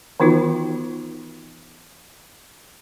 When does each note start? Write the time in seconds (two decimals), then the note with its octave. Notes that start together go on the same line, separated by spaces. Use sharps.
0.20 D#3 E3 B3 D#4 F4 F#4